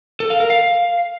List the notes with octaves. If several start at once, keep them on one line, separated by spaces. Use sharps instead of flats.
A4
F5
A#4
F5